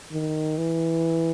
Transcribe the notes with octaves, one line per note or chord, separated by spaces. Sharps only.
D#3
E3